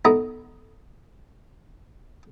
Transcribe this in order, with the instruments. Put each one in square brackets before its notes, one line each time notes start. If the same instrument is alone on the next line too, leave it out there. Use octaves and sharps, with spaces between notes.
[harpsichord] B3 D#4 E4 A4 D#5 A#5